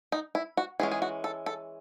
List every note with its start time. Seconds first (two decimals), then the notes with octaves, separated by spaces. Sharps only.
0.12 D#4
0.35 E4
0.57 F#4
0.80 E3 G#3 C#4 G#4
0.92 G#4
1.02 F#4
1.24 A4
1.46 A4